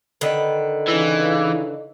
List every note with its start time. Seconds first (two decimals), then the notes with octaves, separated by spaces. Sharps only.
0.21 D3 D#3 B4
0.88 C#3 E3 D#4 E4